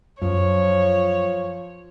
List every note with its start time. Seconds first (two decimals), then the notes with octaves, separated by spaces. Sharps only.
0.22 F#2 F3 C#5